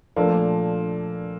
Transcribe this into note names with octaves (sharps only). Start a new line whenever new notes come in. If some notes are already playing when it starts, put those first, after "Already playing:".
A#2 F3 A3 A#3 D4 A4